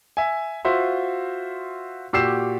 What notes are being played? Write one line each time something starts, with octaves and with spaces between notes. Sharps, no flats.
E5 G#5
F4 F#4 C5 E5 C6
A#2 F#4 G4 E6 C7 E7